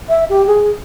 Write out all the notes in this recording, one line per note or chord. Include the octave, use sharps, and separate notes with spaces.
E5
G4
G#4